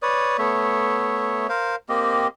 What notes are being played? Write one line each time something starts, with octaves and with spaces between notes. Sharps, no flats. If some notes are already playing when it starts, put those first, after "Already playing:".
B4 C#5 D5 D#6
A3 B3 C#5 E5
A#4 C5 F5
A#3 C4 G4 D#5